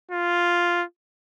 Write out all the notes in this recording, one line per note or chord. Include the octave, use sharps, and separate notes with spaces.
F4